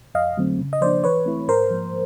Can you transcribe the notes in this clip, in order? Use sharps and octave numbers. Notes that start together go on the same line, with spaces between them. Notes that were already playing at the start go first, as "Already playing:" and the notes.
F2 D#5 F5
D3 F#3 A3 C4
C#3
D#5
F3 A#3 D4 C5 D5
E3 B4 C#5
A3 C4 E4
G#2 A#4 C5
F3 A#3